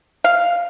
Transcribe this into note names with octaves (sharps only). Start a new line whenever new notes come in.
F5